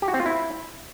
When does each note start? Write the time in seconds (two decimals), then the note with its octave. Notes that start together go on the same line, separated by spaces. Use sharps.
0.02 G4
0.08 F#4
0.14 C4
0.20 F4
0.26 E4